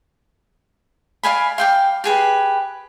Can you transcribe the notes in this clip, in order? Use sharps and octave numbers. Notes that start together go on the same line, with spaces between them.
D5 F5 G#5 B5
F5 G5 D6
G4 G#4 B4